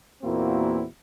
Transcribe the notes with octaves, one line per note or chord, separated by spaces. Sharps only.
E2 A#2 A#3 C4 E4 F#4